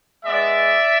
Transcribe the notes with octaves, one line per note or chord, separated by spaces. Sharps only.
G#3 B3 D#4 D5 E5